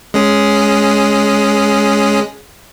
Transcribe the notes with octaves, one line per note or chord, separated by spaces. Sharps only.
G#3 C#4 G#4